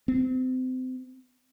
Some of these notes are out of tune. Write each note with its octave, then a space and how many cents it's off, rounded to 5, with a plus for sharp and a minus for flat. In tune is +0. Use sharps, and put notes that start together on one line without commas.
C4 -30